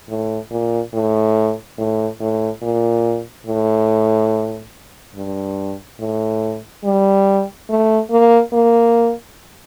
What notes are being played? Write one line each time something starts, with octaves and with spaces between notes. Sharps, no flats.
A2
A#2
A2
A2
A2
A#2
A2
G2
A2
G3
A3
A#3
A#3